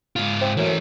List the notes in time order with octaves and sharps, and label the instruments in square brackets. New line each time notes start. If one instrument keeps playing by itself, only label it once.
[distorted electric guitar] G#2 F4
[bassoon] C4
[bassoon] F#2 [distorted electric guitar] E3 A3